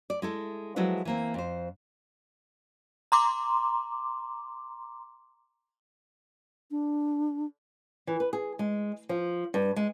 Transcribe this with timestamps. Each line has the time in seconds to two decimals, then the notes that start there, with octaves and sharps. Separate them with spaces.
0.10 D5
0.22 G#3 E4 A4
0.76 F3 F#3 G#3 E4 A4 B4
1.05 E3 A#3 C4
1.34 F2 C5
3.12 A#5 C6 D6
6.71 D4
8.07 E3
8.20 B4
8.33 G#4
8.59 G#3
9.09 F3
9.54 G2
9.76 G#3